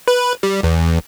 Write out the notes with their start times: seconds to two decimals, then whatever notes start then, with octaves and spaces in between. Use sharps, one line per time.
0.08 B4
0.43 G3
0.63 E2